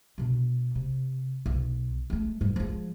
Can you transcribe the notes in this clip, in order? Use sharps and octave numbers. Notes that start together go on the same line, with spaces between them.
B2 D4
C3
B1
G#3 A3
G#2 G3
F3 G#3